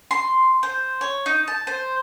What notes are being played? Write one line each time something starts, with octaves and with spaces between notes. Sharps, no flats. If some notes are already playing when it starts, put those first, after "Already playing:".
C6
C5
C#5
D#4
A5
C5